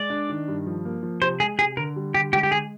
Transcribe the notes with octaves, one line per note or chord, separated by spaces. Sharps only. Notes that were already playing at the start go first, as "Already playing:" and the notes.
Already playing: G#3 D5
D4
D#3
G2
F3
A#3
F3
C3 C5
G#3 G#4
C3 G#4
D3 A#4
G3
D3 G4
G#3 G4
G4
G#3 G#4